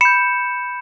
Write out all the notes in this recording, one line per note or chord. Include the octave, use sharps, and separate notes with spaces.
B5 G6 C#7 E7